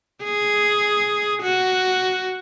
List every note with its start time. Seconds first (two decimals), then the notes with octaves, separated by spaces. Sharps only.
0.24 G#4
1.43 F#4